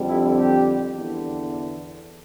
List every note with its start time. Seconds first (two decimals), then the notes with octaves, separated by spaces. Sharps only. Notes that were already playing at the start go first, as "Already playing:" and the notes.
Already playing: F2 D3 G3
0.08 E4
0.36 G4
0.94 E2 D3